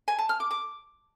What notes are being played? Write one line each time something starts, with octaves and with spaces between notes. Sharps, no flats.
G#5
A5
F6
D6
D6